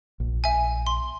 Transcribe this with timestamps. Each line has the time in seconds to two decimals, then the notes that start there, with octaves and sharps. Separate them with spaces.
0.20 A#1
0.44 E5 G#5
0.87 C6